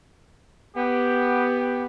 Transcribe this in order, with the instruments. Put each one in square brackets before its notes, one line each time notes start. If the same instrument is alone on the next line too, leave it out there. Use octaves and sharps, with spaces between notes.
[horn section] B3 G4